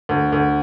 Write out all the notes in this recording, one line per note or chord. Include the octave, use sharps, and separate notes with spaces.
D2
D2